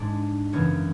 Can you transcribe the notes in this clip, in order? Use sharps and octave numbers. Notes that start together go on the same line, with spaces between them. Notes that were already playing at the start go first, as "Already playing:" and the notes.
Already playing: G#2 G#3 D4
F#2 C#3 E3 B3 C#5